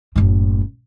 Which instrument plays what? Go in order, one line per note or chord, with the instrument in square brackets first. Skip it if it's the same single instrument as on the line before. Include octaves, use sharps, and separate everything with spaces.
[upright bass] F#1 A2